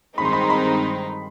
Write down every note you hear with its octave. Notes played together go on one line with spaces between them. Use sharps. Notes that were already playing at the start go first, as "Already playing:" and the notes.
G2 D#3 G#3 C4 D#4 B5
C6
B5
C6
B5